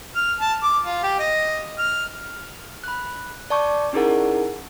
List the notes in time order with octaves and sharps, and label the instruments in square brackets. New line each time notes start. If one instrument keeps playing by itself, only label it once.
[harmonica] F6
A5
D6
F4
G4
D#5
F6
[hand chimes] B5 F#6
D5 A5 C#6 D6 G6
C#4 D#4 E4 G#4 A#4 F#5